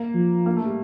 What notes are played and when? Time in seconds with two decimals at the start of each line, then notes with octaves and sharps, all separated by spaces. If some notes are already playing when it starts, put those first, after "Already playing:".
Already playing: A#3
0.15 F3
0.46 A#3
0.56 A3
0.66 G3